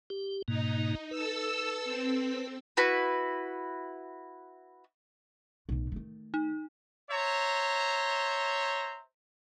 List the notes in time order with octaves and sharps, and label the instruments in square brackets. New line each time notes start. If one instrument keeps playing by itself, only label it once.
[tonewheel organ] G4
[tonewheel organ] G#2 B2 A#3 [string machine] D#4
[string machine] A4 E6 [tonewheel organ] B4
[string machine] C4
[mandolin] E4 F#4 B4
[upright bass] B1 A2
D#3 A3
[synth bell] D#4
[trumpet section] C5 C#5 E5 A#5